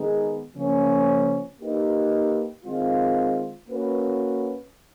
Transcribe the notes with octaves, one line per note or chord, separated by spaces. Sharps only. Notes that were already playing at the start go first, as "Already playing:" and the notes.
Already playing: D#3 G#3 B3 D#4 G#4
C#3 F3 A#3 C#4
A#3 D#4 G4 B4
D#3 G#3 C4 F4
A#3 C#4 F#4 B4